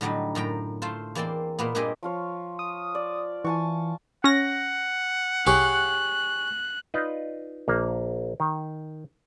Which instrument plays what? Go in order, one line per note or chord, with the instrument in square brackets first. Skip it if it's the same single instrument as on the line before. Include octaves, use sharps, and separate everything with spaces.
[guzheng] A2 D3 F#3 G3 D#4
F#2 A2 G5 A#5
A3 F4 C5
E2 A#3 C4 D5 G5 C6
A#2 A#3 B3
G2 A#2 C4 G4 G#4 D#5
[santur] F3 F4 C#5
[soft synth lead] D#6
[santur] D5
[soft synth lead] E3 [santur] G#5 A5 C#6
[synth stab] C#4 A#6 [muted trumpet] F#5
[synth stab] C2 [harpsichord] G4 G#4 C#5 [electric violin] F#6
[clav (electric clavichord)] D#4 F4 B4 D5 D#5
A#1 A#3
D#3